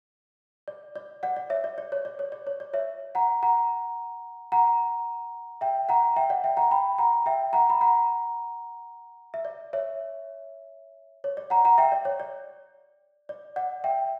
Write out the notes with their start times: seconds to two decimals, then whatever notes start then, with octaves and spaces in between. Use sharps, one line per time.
0.68 D5
0.96 D5
1.23 D5 F#5
1.36 D5
1.50 C#5 E5
1.64 D5
1.78 D5
1.92 C#5
2.05 D5
2.19 C#5
2.32 D5
2.47 C#5
2.60 D5
2.73 C#5 E5
3.15 F#5 A#5
3.43 F#5 A#5
4.52 F#5 A#5
5.61 E5 G5
5.89 F#5 A#5
6.16 E5 G5
6.30 D5 F#5
6.44 E5 G5
6.57 F#5 A#5
6.71 G5 B5
6.98 F#5 A#5
7.26 E5 G5
7.53 F#5 A#5
7.70 B5
7.81 F#5 A#5
9.34 E5
9.45 D5
9.73 C#5 E5
11.24 C#5
11.37 D5
11.50 F#5 A#5
11.65 F#5 A#5
11.78 E5 G5
11.92 D5
12.05 C#5
12.20 D5
13.29 D5
13.56 D5 F#5
13.84 E5 G5